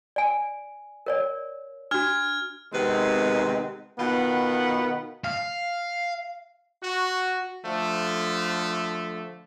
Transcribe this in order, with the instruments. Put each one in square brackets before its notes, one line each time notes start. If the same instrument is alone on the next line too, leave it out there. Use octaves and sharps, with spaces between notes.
[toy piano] D5 G#5
A#4 C#5 D5
[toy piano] D4 F#4 [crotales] F6 G#6
[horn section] C3 D#3 G#3 B3 C4
B2 D#3 B3 F4 F#5 B5
[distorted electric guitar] F5
[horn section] F#4
D3 F3 A3